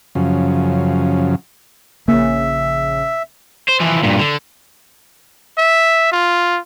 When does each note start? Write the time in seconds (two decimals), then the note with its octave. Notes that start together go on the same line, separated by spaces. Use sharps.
0.15 F#2 C#3 F3
2.08 A#1 C#3 A#3 E5
3.69 C5
3.81 E3 F3
4.03 G2 A#2
4.19 D3
5.58 E5
6.12 F4